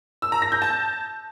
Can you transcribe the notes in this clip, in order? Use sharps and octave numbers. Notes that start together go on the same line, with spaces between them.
E6
A#5
A#6
G6
A5